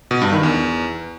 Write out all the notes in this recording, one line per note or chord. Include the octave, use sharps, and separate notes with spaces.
B2
G2
D#3
E2